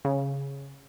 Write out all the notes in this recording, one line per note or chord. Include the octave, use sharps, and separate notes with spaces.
C#3